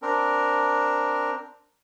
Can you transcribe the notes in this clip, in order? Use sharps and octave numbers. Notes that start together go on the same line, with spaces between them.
C4 D4 A#4